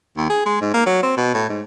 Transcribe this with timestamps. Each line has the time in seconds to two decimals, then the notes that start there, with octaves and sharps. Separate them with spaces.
0.17 D#2
0.30 G#4
0.46 G#3
0.61 G#2
0.74 A#3
0.86 F#3
1.03 C4
1.17 B2
1.34 A2
1.49 G#2